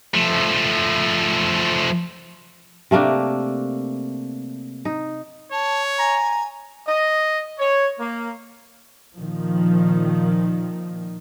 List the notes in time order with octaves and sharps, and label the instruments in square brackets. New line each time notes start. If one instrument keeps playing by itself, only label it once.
[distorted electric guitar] F3 A3
[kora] C3 A3 A#3 D4
D#4
[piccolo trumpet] C#5 [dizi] A5
[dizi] G#5 [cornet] A#5
[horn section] D#5
C#5
A#3
[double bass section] A#2 D#3 F3